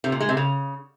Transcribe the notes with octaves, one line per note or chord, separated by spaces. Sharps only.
C3
A#2
G#3
C3
C#3